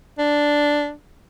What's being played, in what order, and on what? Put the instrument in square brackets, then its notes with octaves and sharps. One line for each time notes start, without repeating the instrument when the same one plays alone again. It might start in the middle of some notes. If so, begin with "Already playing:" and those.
[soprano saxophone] D4